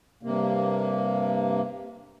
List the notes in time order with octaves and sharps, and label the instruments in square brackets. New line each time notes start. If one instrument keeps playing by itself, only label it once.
[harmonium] G2 C3 A#3